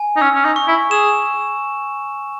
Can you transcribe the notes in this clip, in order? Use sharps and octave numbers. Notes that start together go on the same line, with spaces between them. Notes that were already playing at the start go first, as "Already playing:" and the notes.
Already playing: G#5
D#4
C#4 E6
C#4
D#4
C#6
E4
G#4 E7